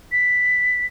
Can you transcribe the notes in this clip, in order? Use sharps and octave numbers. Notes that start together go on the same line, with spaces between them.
B6